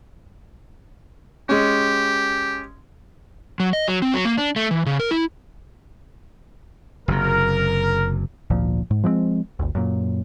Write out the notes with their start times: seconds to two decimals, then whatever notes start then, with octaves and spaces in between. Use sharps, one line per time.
1.49 G#3 C#4 G4
3.60 F#3
3.73 D#5
3.88 F#3
4.02 C4
4.14 F#3
4.25 A#3
4.38 D4
4.56 A3
4.71 E3
4.86 C#3
5.00 A#4
5.11 E4
7.08 F#1 C3 A#4
8.50 G#1 D2 A#2 F3
8.91 G#2
9.04 F3 G#3 A3 C4
9.59 G1 D2
9.75 F#2 A#2